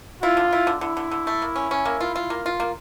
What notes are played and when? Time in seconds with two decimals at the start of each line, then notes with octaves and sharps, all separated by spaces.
0.23 E4 F4
0.37 D3
0.52 E4
0.67 D3
0.81 D3 E4
0.97 D3
1.11 D3
1.27 A3
1.42 A#3
1.55 C#4
1.71 C#4
1.85 A#3
2.01 F4
2.16 F4
2.30 A#3
2.46 F4
2.60 A#3